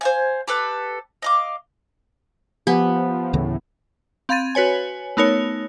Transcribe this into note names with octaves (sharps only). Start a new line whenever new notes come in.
C5 F5 G#5
G4 A4 B4
D#5 F5 D6
F3 B3 G4 G#5
D2 A2 C#3 E3
C4 F5 B5 G#6 A6 D#7
F#4 B4 C#5 G#5
A3 B3 D#4 A#4 C#5